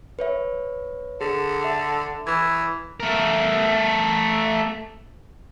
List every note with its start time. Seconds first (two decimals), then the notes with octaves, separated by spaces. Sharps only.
0.19 B4 C#5 E5
1.21 D3 G#4
1.64 E5
2.27 E3 G#6
3.00 A3 A#4